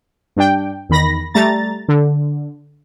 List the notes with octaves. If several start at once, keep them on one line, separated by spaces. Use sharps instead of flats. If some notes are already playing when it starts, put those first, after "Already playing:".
G2 D4 G5
E2 D#3 B5 A#6
G3 A3 A#5 A6
D3